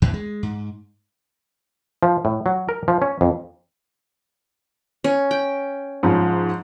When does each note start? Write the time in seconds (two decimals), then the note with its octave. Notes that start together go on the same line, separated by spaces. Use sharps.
0.02 E2 A2 D3
0.14 G#3
0.43 G#2
2.03 F3
2.25 A2
2.46 F#3
2.69 A#4
2.88 F3
3.02 C#4
3.21 F2
5.04 C#4
5.31 G5
6.03 G#2 F3 C#4